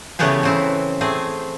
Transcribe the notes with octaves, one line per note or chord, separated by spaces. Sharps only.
C#3 E3 A3 B3 G4 G#4
C#3 C4 E4
A3 C4 G#4